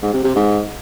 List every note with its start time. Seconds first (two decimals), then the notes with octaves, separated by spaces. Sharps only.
0.02 G#2
0.14 C3
0.25 C3
0.36 G#2